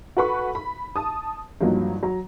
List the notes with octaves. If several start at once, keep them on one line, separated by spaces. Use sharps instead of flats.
F#4 A4 B4 B5 C#6
B5
A5 D#6
G2 F3 F#3 A#3 D#4
F#3 A#5